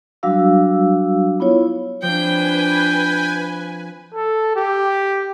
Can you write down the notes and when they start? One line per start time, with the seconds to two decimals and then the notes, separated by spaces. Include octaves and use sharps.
0.23 F#3 G3 D4 F#4 F5 E6
1.40 B3 E4 F4 C#5
2.02 F3 C4 D4 B4 C5 G5 G#5 G6
4.14 A4
4.56 G4